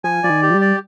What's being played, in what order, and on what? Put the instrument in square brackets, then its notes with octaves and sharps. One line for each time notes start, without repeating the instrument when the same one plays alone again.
[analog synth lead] F3 [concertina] G#5
[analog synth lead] F3 [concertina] D5
[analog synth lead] D#3
[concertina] G4
[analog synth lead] F3
G3
[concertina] D5